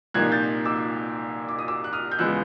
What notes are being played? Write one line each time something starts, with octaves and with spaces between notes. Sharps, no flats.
C2 A#2 F3 A#3 D#4 F#6 G#6
G6 A6
D6 E6
D6
D#6
D6 E6
F#6
D#6 F6
G6
E2 C#3 F3 G#3 B3 E6 F#6